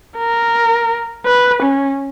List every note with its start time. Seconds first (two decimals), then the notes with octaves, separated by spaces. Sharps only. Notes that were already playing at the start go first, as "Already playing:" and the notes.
0.18 A#4
1.26 B4
1.63 C#4